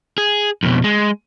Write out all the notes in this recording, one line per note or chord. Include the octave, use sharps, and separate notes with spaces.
G#4
F2 B2
G#3